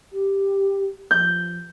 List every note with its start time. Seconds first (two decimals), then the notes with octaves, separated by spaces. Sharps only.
0.13 G4
1.11 F3 G6